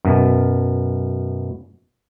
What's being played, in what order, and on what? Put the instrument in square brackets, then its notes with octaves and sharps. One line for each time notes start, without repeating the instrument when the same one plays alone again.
[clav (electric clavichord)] F#2 B2